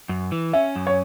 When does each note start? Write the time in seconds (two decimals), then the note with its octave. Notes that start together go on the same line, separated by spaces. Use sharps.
0.09 F#2
0.32 E3
0.53 C#4 E5
0.76 F#2
0.87 C#5